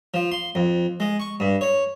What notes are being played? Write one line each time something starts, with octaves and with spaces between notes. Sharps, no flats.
F3
C6
F2
G#3
C#6
G2
C#5